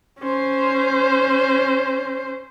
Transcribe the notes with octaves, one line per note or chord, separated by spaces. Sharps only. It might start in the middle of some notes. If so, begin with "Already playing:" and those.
C#4 C5